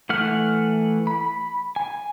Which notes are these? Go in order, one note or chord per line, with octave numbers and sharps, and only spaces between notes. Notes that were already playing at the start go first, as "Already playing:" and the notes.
E3 A3 F#5 F6
B5
G#5